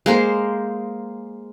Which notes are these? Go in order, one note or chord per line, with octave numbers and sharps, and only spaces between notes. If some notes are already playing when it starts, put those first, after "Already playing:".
G#3 A#3 C5